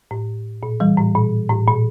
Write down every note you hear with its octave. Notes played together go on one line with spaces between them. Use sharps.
A2
A#2
E3 G3
A2
A#2
A2
A#2